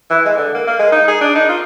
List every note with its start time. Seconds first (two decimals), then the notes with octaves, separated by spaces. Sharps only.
0.10 E3
0.25 G#3
0.37 D3
0.54 A#3
0.67 A#3
0.79 G#3
0.92 D#4
1.08 G#4
1.21 D4
1.35 D#4
1.49 F4